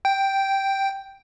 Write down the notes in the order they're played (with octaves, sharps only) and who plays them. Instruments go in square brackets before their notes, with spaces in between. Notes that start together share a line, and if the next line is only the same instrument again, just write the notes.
[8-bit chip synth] G5